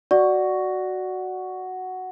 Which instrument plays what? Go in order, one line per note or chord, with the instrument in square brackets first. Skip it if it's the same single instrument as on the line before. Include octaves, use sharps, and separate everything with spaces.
[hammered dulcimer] F#4 [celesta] D5